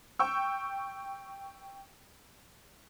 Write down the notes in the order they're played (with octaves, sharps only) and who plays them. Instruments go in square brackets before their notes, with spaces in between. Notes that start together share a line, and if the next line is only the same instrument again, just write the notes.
[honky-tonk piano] G5 C#6 E6